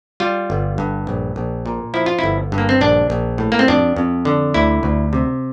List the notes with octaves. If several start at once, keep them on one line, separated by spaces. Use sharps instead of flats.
G3 F4
G1
G2
A#1
A#1
A#2
F3 E4
F4
G1 E4
G2
A#3
C4
A#1 D4
A#1
A2
A#3
C4
F2 D4
F2
D3
D2 E4
D2
C3